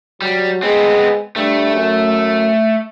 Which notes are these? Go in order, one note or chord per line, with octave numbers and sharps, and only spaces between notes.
F#3 G3
G#3 B3 C4
G2 A3
F#2